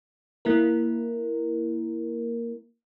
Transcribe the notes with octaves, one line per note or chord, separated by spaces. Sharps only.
A#3 E4 A#4